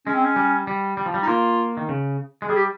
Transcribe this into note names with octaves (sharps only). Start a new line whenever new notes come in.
G#3 C#4
C4
C#4
G3
G3
G3
F3
G3
D#4
A#3 F4
D#3
C#3
G#3
G3 G#4
G4